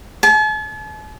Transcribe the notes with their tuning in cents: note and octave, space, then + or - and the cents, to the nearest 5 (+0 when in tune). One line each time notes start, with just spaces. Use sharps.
A5 -45